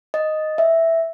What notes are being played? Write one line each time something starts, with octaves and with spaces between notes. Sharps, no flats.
D#5
E5